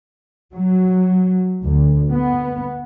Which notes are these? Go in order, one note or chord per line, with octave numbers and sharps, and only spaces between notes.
F#3
D2
B3